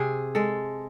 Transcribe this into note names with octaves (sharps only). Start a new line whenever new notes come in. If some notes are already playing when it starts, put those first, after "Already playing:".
Already playing: C3 G#4
G#3 A4